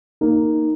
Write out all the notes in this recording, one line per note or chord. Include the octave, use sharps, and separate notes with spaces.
A#3 D#4